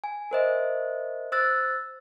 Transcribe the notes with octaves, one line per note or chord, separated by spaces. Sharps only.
G#5
A#4 C5 D#5 E5
C5 E6 F#6 A6